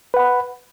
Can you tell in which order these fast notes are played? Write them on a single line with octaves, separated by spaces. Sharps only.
B4 F#5 B5